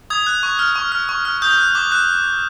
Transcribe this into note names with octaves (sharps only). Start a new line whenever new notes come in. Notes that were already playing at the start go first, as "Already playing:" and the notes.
D#6 G#6
F#6
C#6
F6
C#6
F6
C#6
F6
D#6 G6
F#6
D6
F#6